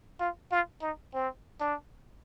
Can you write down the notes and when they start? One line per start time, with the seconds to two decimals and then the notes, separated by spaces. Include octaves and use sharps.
0.20 F4
0.51 F4
0.82 D#4
1.14 C4
1.60 D4